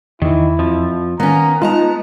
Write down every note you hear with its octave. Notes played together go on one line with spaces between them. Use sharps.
E2 D#3 E3 E4
F2 F3
D#3 A#3 B3 C#4 A#5
G#3 D#4 F4 A5 A#5